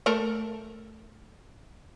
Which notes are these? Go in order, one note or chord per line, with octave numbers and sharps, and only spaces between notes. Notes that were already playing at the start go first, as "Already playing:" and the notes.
A3 A4 A#4